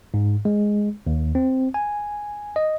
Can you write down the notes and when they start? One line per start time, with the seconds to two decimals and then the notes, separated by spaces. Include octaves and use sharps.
0.14 G#2
0.45 G#3
1.07 D#2
1.35 C4
1.74 G#5
2.56 D#5